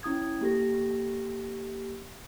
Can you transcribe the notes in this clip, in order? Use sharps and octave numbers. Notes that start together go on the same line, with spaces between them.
C#4 E4 D#6 G#6
A#3 G4 A4 A#6